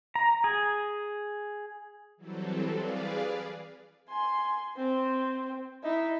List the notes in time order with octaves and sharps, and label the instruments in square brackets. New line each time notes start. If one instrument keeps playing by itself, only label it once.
[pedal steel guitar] A#5
G#4
[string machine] E3 F#3 G3 C4 A4
G#4 B4 D5 F5
[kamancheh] G#5 C6
C4
D#4 E4